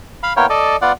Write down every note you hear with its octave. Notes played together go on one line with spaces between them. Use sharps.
F5 B5
A#3 B3 E4 A#4 C#5 G5
A4 D5 D#5
B3 F4 D5 F#5